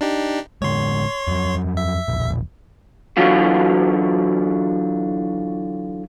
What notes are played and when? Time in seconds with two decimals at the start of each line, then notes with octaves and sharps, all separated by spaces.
0.01 D4 D#4 G4
0.62 A2 D3 G#3 C#5 C6
1.28 F2 F#3
1.77 E5
2.08 E1 A#1
3.17 D3 E3 F#3 F4 F#4